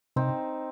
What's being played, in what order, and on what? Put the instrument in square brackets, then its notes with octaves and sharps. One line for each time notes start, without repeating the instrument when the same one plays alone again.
[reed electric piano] C3 [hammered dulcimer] C4 D#4